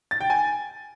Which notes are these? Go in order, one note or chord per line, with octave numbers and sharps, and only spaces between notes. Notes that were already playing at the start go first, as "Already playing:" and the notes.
A6
G5
G#5